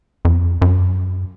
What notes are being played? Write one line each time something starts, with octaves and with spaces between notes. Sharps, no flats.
F2
F#2